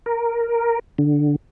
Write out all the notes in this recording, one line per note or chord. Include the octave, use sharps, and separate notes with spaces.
A#4
D3